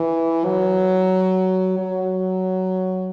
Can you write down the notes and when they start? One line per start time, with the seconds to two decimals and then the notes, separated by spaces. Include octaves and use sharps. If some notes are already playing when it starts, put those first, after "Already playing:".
Already playing: E3
0.45 F#3
1.79 F#3